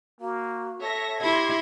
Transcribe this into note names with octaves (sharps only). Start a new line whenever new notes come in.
A#3 F#4
A4 C#5 E5 A#6
E4 G4 C6 G#6 A#6